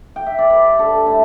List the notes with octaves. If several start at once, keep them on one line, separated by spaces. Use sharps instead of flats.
G5
E5
D5
G3 B4
D4 A4
A2 E4